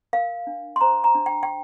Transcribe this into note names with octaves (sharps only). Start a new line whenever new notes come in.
A#4 F5
D4
C6
C5 A#5
A#5
D4
G5
G5